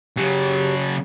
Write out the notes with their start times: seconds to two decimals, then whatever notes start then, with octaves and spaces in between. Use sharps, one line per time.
0.17 C#3 F#3 G4